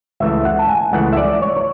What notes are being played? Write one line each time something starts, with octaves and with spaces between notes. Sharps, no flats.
C#2 C#3 E3 A3 E5
F#5
A5
G#5
C#2 C#3 E3 A3 F#5
E5
D5
C#5